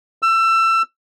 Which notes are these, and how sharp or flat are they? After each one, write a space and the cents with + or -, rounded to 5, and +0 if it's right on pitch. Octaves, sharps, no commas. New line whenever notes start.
E6 +25